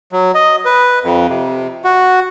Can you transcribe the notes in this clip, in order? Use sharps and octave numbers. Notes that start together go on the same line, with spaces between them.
F#3
D#5
B4
F2
C3
F#4